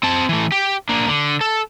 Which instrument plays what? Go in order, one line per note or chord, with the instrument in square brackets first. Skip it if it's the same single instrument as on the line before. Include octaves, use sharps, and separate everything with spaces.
[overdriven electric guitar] C4 A5
E3 A3
G4
A#3 D4
D3
A4